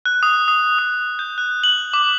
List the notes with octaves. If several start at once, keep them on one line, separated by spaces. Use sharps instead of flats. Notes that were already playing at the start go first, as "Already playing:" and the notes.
F#6
D#6
D#6
D#6
G6
F#6
F#7
D6